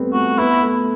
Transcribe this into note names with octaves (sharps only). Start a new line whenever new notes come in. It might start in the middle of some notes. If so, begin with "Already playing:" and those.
Already playing: G3 A3 B3 C4
A3 F#4
B3 E4
A3